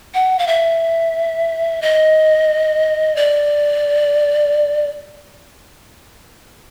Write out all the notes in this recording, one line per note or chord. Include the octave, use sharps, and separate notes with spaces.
F#5
F5
E5
D#5
D5